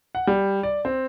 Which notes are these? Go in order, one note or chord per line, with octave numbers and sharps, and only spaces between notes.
F#5
G3
D5
C4